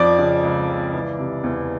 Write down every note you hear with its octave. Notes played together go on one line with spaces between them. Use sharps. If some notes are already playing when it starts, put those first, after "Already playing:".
Already playing: F2 F3 D5 D6
C#3
C#2
C#2
E3
C3
E2